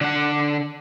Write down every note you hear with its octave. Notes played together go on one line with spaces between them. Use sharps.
D3 F#5